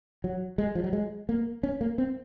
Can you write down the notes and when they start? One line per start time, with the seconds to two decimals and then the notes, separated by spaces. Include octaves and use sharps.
0.24 F#3
0.58 G#3
0.75 F3
0.84 F#3
0.93 G#3
1.29 A#3
1.63 C#4
1.81 A#3
1.98 C4